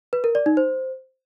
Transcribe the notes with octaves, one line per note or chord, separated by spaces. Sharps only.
B4
A#4
D5
D#4
C5